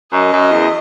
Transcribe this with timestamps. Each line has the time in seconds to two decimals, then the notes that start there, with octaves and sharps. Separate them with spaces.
0.13 F#2 D#5
0.33 F#2
0.52 E2